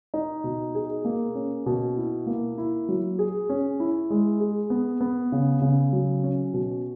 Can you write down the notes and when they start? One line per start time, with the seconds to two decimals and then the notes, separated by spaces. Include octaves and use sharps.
0.14 D#4
0.44 B2
0.75 G#4
1.05 A#3
1.35 C#4
1.66 B2
1.97 E4
2.26 A#3
2.58 E4
2.89 F#3
3.19 G#4
3.49 C#4
3.80 E4
4.10 G#3
4.40 G#4
4.70 B3
5.01 B3
5.32 C#3
5.62 C#3
5.93 F#3
6.24 C#4
6.54 B2